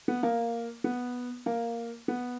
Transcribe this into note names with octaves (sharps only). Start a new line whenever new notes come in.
B3
A#3
B3
A#3
B3